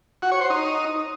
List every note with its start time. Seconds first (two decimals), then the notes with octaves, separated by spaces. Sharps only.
0.22 F#4
0.32 C#5
0.41 C5
0.50 D#4